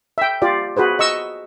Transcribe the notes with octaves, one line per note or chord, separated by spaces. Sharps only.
E5 G5
F4 G4 D5
F#4 G#4 B4 C5
D#5 C#6 E6